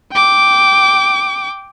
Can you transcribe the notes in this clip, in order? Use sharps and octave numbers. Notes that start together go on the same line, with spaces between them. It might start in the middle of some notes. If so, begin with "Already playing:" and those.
G5 D6